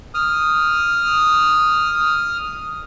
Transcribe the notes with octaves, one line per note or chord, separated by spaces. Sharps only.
D#6 F6